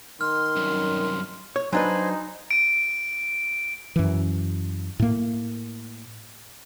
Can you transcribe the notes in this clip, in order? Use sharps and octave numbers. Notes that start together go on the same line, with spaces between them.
D#3 C6 F6
C2 F#2
C#5
F#3 D4 D#4 B4 C5 G#5 C6
D7 D#7
F#2 E3
A2 A#3